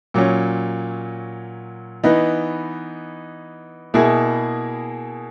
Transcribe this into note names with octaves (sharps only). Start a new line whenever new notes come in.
A#2 F#3 C#4
E3 B3 D#4
B2 A#3 E4 G#4